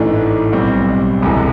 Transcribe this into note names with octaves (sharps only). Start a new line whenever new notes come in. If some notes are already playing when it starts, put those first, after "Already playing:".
Already playing: A1 G#2 E3 A3 D4
B1 B2 G3 C4
E1 D2 C3 E3 G#3